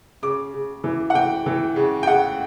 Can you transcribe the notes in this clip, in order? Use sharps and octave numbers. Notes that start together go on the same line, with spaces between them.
C#3 D6
C#3
E3
F#5
E3 G5
E3
C#3
G5
C#3 F#5